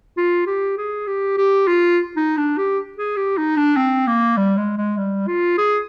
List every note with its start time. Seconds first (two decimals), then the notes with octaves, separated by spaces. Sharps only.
0.17 F4
0.46 G4
0.78 G#4
1.07 G4
1.38 G4
1.67 F4
2.17 D#4
2.37 D4
2.57 G4
2.98 G#4
3.17 G4
3.37 D#4
3.57 D4
3.77 C4
4.07 A#3
4.37 G3
4.57 G#3
4.77 G#3
4.98 G3
5.27 F4
5.58 G#4